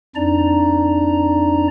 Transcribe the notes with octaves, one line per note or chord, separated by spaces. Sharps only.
F2 D4 D#4 D5 A#5